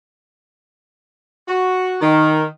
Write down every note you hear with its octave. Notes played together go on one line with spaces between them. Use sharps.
F#4
D#3